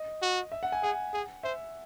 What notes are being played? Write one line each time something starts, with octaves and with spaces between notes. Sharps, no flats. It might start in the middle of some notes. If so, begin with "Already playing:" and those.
Already playing: D#5
F#4
E5
F#5
G#5
G#4 F#5
G#4
C5 E5